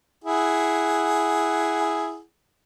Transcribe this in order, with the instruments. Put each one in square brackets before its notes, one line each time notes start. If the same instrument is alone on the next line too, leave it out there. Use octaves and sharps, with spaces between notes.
[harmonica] E4 G#4 F#5